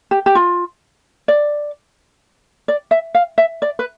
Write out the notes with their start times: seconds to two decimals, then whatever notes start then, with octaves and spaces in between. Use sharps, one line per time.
0.11 G4
0.26 G4
0.35 F4
1.28 D5
2.68 D5
2.91 E5
3.15 F5
3.38 E5
3.62 D5
3.79 B4